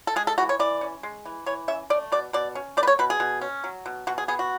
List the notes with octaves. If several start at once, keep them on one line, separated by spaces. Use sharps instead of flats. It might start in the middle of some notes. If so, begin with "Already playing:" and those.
A4
G#3 G#4
A4
E3 F#4
C#5
E3 D5
C#4
G#3
E3
E3 C#5
C#4 E5
A3 D5
B2 D5
B2 D5
C#4
A3 D5
B4
C#5
B2 B4
G#4
B2
C#4
F#3
B2
B2 F#4
G#4
B3 G#4
F#4